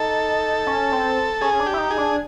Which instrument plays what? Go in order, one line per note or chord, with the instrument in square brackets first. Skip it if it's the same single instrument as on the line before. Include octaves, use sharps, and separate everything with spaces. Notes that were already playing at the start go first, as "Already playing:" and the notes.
Already playing: [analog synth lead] D#4 [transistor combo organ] A4
[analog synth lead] C#4
C4
[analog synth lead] C#4 [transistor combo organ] G#4
[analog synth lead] D4
[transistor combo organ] G4
[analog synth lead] E4
D#4
[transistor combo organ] G#4
[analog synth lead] D4